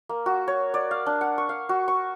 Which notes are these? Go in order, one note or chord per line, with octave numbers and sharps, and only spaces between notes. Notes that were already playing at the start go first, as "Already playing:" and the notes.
A#3
F#4
C#5
D5
F5
D4
F#5
C#6
F5
F#4
C#6